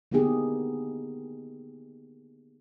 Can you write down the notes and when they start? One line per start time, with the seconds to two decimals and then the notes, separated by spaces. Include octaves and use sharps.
0.11 D3 A#3 B3 D#4 G4 G#4